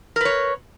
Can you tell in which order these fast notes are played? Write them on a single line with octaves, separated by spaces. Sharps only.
A#4 B4 C#5